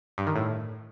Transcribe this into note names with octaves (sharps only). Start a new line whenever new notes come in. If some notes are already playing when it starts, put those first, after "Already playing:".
G2
D#3
A2